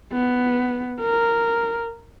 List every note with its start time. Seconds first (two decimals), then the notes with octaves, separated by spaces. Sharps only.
0.13 B3
1.01 A#4